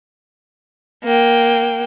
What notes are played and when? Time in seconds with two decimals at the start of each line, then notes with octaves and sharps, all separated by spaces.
1.04 A#3 G5